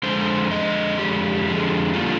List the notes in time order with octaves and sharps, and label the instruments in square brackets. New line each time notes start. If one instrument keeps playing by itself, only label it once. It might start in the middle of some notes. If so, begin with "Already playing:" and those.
[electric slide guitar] F2 D3 G#3 C5
F2 D3 G#3 D#5
F2 D3 G#3 G4
F2 D3 G#3
D3 G3 A#3 F4